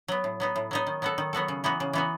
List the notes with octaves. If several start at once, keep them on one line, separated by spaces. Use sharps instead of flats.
F#3 B3
A2
F#3 B3 D#4
A2
F#3 B3 D#4
D#3
F#3 B3 F#4 A4
D#3
F#3 B3 F#4 A4
C#3
E3 B3 D#4 F#4
C#3
E3 B3 D#4 F#4